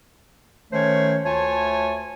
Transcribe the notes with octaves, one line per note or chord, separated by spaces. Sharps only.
D#3 A3 C#4 C5 C#5
D2 A3 F4 C#5 G#5 A5